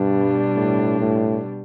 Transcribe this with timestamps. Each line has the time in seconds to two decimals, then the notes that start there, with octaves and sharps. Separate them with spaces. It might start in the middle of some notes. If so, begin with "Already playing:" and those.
Already playing: G2 B2 G3 D4
0.55 A2
1.00 A2